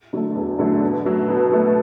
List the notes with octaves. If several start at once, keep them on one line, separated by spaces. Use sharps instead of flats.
D3 F#3 A3
E2
D3 F#3 A3
B2
F#3 A3
B2
F#3 A3